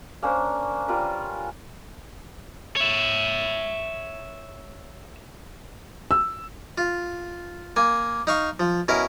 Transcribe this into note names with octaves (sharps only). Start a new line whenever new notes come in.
A#3 C#4 D4 C5
G3 F4 A#4 B4
C#5 E5
E6
F4
A#3 G#5
D#4 F5 C#6
F3
B2 C#4 E4 A#4